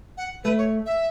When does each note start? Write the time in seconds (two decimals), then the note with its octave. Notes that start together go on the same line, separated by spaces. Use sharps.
0.17 F#5
0.44 A3 B4
0.58 C#5
0.86 E5